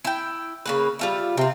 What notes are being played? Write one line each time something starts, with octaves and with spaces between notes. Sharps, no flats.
E4 G5
C#3 A#3 B4
G3 F4 E5
C3 C4 F4